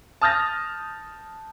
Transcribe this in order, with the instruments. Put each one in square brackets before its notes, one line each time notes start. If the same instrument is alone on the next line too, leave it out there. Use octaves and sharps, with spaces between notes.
[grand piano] A5 D#6 F6 G6 A6 A#6